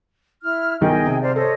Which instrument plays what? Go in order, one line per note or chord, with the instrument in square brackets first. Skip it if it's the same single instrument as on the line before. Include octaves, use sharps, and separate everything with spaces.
[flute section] E4 F6
[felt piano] B1 D#3 [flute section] G#4 D#5 G5
[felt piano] C3
[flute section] C5 D5 F5
[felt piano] A4 [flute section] C5 C#5 D#5